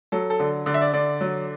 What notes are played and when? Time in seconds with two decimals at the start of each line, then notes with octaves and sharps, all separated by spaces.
0.12 F#3 A4
0.30 A4
0.40 D3
0.66 D3 D5
0.74 E5
0.81 D5
0.93 D3 D5
1.21 F#3